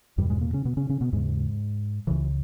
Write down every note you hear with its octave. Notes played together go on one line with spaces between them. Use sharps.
E2 G2 B2 G3
G#2 G#3
A#2 A#3
C#3 C#4
B2 B3
C#3 C#4
C#3 C#4
B2 B3
D#2 G#2 C#3 G#3
C#2 C#3 E3